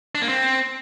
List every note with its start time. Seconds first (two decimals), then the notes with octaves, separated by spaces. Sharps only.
0.15 D4
0.22 A#3
0.29 C4